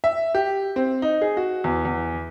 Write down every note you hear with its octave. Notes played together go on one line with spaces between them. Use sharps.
E5
G4
C4
D#4
G#4
F#4
E2
E2